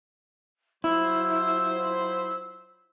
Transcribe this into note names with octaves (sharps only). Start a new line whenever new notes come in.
F#3 E4 F4 C5 E6